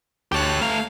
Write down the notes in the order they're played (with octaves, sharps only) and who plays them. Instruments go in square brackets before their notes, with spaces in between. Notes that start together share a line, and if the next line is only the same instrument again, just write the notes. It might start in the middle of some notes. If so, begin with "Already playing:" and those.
[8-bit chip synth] D2 A5 F#6 [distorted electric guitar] G4 C#5
[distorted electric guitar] A3 A#5 [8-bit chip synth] F5